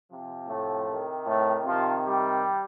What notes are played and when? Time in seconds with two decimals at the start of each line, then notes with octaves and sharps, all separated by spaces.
0.09 C3 F3
0.47 A2 A3
0.87 C3 D#3
1.26 A2 A3
1.65 C3 D#3 F3 F4
2.04 G3 G4